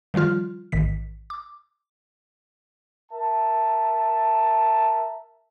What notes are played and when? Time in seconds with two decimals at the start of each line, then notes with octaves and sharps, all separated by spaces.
0.14 D#3 F3 G3 F4 F6
0.72 A1 G#2 D#3 B6
1.30 D6
3.12 A#4 E5 A5